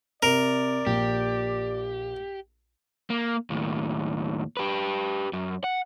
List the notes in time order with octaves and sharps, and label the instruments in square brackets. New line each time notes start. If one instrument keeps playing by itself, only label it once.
[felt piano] C3 [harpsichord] A#4 [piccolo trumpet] D5
[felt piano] A#1 [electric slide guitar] G4
[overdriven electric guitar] A#3
D#2 A2
G4 B4
F#2
F#5